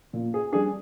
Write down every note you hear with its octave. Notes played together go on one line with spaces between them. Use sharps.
A#2
G#4
G3 D4 G#4